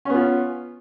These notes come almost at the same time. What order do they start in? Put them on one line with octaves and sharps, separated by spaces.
C#4 B3 F4